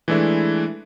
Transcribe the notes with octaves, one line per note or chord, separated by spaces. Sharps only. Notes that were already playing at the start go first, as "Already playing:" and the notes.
E3 G#3 A3 D4 E4